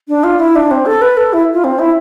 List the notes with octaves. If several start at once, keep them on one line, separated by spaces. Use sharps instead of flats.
D4
F4
E4
D4
C4
A4
B4
A4
E4
F4
C4
E4